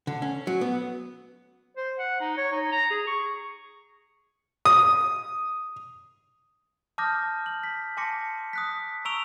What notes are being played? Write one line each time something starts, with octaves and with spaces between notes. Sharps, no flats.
D3
C#4
F#3
B3
C5
F#5
D#4
C#5
D#4
A#5
G#4
C#6
D#6
A5 D6 D#6 F6 G6 A#6
F#7
B6
G#5 A5 C6 D6 A#6 C#7
D#6 F#6 B6
A#5 C#6 E6 D7 F7 G7